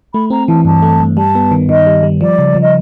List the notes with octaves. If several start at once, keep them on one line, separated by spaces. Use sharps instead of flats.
A3 B5
C4 A#5
E3 A5
G2 A5
A3
G2
G3 A5
B3
D#3
D#3 D#5
G3
G3
F3 D5
C#3
F3
D#5